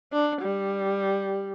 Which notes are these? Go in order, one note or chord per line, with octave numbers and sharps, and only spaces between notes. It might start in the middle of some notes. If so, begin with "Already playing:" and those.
D4
G3